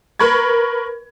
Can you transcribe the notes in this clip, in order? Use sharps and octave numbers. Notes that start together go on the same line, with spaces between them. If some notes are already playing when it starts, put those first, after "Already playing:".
A#4 B4 B5 C#6 G#6